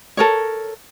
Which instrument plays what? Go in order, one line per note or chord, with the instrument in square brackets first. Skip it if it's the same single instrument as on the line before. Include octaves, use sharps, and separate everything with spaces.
[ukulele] A4 A#4 C#5